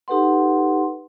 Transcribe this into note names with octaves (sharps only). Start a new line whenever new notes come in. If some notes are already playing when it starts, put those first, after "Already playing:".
D#4 G4 A4 B4 F#5 C6